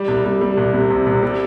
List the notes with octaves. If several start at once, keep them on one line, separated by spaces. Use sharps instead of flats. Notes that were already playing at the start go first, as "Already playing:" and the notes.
Already playing: G3
C2
G3
G3
C2
C3
C2
C2
G3